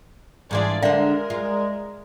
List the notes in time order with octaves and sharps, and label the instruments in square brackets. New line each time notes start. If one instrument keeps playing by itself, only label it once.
[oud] G#2 E3 D4 [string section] F4 G#4 D5
[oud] D3 D4 [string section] G#3 A#4 [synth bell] D5 E5
[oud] F4